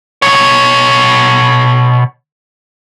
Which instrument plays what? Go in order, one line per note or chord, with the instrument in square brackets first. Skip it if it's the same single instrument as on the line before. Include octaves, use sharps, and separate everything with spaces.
[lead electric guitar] B2 C#5